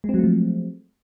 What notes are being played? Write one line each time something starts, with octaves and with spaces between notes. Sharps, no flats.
F3 F#3 G#3 A3 C4